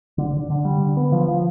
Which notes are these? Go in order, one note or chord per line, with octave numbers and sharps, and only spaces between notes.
D3
D3
D3
G3
D3
B3
F3
F3